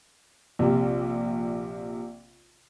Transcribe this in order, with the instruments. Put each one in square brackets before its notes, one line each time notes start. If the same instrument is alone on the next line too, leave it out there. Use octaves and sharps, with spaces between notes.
[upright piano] A#1 C3